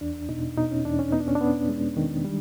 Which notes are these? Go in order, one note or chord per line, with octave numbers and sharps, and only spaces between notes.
E2 D4
B2 D#4
B2 D#4
C#4
E2 D4
C#4
B3 D#4
D4
C#4
D4
B3
G#3
D#3
G3